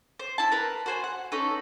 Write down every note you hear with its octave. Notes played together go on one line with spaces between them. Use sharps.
C5
E4 A5
A#4 B4
F#4 C5 G#5
F#5
C#4 D#4 A4 B4